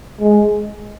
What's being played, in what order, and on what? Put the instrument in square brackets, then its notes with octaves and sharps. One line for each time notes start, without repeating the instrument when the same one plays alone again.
[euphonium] G#3